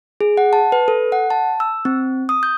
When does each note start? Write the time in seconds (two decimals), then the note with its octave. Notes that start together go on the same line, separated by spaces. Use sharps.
0.21 G#4
0.37 F#5
0.53 A5
0.72 B4
0.88 A4
1.12 F#5
1.30 A5
1.60 E6
1.85 C4
2.29 D#6
2.43 G6